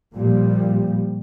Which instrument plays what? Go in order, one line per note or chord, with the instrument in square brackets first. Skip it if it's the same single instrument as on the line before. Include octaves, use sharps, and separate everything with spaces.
[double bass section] A#2 F3 G3